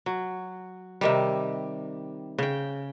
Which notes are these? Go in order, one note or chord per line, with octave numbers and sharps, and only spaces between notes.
F#3
C3 D#3 G3
C#3 G5